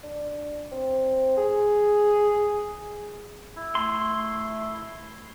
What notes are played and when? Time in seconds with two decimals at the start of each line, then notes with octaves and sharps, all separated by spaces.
0.04 D4
0.72 C4
1.37 G#4
3.56 E4
3.75 A3 C6